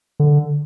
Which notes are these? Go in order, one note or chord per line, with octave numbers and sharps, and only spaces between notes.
D3